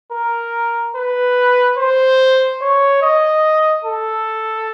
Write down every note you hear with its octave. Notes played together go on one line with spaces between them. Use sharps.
A#4
B4
C5
C#5
D#5
A4